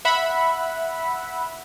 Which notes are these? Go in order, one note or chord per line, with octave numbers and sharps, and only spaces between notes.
E5 F#5 B5